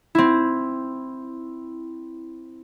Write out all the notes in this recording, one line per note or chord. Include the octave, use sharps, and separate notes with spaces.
C4 E4